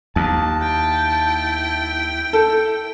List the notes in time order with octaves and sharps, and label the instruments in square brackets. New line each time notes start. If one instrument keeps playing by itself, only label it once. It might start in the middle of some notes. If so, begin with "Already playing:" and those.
[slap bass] D#2 [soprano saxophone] A5
[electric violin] E4 G5
[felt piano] A4